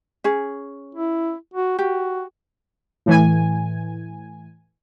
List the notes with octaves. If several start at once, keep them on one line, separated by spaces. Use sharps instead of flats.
C#4 G#4
E4
F#4
F#4 G4
A2 E3 G#5